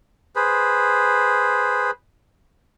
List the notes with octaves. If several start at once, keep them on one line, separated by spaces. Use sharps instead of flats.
G#4 B4 C5